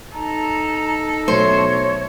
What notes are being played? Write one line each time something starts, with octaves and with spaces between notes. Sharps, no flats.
D#4 A4 A#5
B2 F#3 A3 C5 C#5